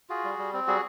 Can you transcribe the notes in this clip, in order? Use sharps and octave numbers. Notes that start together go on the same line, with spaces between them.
F4 F#4 G#4
G3
G3
C4
G3 F#4 G#4